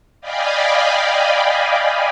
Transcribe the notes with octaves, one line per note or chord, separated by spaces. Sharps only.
D5 D#5 F5 G5 G#5 B5